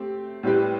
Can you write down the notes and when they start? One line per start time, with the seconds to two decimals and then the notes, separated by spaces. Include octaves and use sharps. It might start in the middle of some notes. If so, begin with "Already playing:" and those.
Already playing: A3 C4 G4
0.43 A2 G3 C4 G4 B4